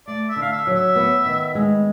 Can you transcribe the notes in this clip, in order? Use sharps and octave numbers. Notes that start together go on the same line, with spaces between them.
A3 D5
E5
D3
F5
E5
F#3
E5
B3
D#3
G#3